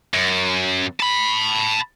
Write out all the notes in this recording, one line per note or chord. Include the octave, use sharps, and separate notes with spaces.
F#2
A5 B5